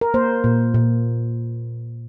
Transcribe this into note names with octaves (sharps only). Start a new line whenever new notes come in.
A#4
A#3 C5
A#2
A#2